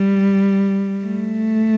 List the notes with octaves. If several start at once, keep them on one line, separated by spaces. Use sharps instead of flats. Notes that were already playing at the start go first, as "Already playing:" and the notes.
Already playing: G3
A3